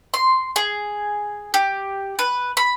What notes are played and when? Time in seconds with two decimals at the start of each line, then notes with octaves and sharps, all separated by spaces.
0.14 C6
0.56 G#4
1.54 G4
2.19 B4
2.57 B5